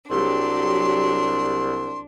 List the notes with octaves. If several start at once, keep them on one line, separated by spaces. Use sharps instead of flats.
C2 F#3 D4 G4 G#4 C6